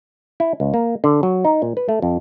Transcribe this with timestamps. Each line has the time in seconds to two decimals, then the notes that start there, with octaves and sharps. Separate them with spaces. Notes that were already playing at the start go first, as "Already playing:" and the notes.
0.40 E4
0.60 C#2
0.74 A#3
1.04 D3
1.23 F#3
1.45 D#4
1.62 A#2
1.77 B4
1.89 A3
2.02 F2